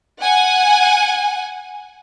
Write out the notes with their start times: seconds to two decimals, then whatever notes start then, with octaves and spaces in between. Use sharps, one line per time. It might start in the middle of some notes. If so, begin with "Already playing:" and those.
0.21 F#5 G#5